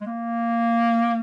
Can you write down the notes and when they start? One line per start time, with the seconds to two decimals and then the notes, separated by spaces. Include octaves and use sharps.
0.01 G#3
0.06 A#3